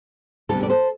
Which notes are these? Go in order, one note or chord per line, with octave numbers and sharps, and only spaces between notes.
D2 C3 G3 B3 D4 F4 A4
D5
A4 C5